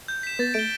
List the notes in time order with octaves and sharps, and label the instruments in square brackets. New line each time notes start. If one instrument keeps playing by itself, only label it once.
[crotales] G6
B6 E7
[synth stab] B3 [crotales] A6
[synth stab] A3 [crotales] D7 G7